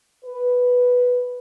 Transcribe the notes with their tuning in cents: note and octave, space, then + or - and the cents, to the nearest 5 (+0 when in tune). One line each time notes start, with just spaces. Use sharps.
B4 +0